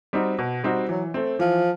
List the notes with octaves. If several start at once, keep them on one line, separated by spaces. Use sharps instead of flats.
G3 C4 D#4 F#4
B2
G3 C4 D#4 F#4
E3 F#3
A3 C4
E3 F3